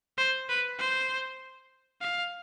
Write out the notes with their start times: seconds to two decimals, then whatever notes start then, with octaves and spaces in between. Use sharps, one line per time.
0.18 C5
0.49 B4
0.79 C5
2.02 F5